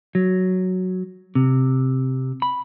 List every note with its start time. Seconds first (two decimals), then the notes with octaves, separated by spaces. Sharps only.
0.15 F#3
1.35 C3
2.42 B5